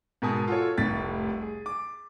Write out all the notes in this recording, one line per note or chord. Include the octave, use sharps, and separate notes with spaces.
G#2 B2 A#4 G#5 A5 D#6
F4 F#4 A4 C#5
F1 C2 A2 A6 B6
G#4
D6